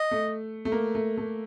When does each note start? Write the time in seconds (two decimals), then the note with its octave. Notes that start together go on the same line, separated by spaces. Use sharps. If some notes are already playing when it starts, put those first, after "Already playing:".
Already playing: D#5
0.11 A3
0.65 A3
0.72 A#3
0.95 A3
1.17 A3